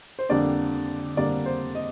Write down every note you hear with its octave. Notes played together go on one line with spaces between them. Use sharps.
C5
F2 D3 G3 A#3 D4 D5
F2 D3 G3 A#3 D4 D5
C5
D#5